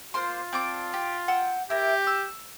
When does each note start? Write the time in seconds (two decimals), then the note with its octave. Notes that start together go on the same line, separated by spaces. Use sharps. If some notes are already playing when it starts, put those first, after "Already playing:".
0.14 A#3 F4 C5 C6
0.53 C4 D4 D6
0.94 G4
1.28 F#5 G5 E6
1.70 E4 G4 A#4
2.07 E6